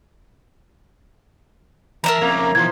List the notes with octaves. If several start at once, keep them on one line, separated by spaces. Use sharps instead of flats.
E3 A#4 E5 A5 A#5
F2 C#3 A#3
B1 E3 F3 C5 G#6